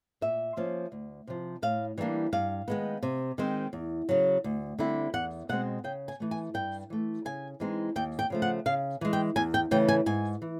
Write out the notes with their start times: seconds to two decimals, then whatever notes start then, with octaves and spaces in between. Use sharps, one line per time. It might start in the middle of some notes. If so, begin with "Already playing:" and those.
0.21 A#2 E5
0.57 F3 A#3 C#4
0.92 D2
1.27 C3 F3
1.62 A2 F5
1.98 E3 G3 A#3 D4
2.33 G2 F5
2.68 D#3 G#3 B3
3.03 C3
3.38 D#3 G#3 C4
3.73 E2
4.09 C#3 F#3
4.44 D2
4.79 D3 G3 C4 E4
5.14 E2 F#5
5.49 B2 G#3 C4 F#5
5.84 C#3 G5
6.08 G#5
6.20 E3 A3
6.31 G#5
6.54 G2 G5
6.90 E3 A3
7.25 C#3 G#5
7.60 E3 G#3 C4 D#4
7.96 D#2 G5
8.19 G5
8.30 C#3 F3 A3
8.42 F#5
8.66 C#3 F5
9.01 E3 G#3
9.13 G5
9.36 E2 G#5
9.54 G5
9.71 C#3 E3 A3 G5
9.88 G#5
10.06 G#2 G#5
10.42 E3